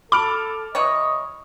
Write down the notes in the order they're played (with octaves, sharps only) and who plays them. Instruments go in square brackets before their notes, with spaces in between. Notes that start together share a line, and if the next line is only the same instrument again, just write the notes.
[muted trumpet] A4 [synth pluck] B5 [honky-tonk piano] D6 F6 D7
[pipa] E3 F#3 C#5 [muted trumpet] D#5